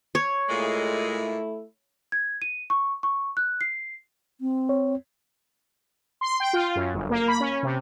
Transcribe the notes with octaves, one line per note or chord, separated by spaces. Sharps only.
C#5
A#2 G#3 A3 E4
G#6
D#7
C#6
C#6
F#6
C7
C4
C#5
C6
G5
F4
F#2
G1
A#3
B5
C#4
C3